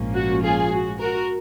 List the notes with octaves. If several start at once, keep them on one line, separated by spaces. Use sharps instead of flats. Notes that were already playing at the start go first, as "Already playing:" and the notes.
Already playing: A#1 G#2 F3 A#3 C#4
F#4
F4 G#4
F#4
F#4 A#4